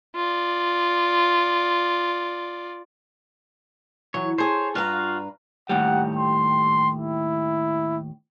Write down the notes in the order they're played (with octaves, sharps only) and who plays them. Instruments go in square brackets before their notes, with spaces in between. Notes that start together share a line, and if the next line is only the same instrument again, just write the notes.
[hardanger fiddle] F4 D5
[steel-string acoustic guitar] E3 F#3 [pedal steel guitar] C#5
[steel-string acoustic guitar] G#4 A4 [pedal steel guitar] C5 C#5
[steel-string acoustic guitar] G2 B4 A#5 [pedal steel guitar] F4 F#4 F5
[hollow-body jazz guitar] D#2 A2 G3 [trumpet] F#5
[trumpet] C6
E4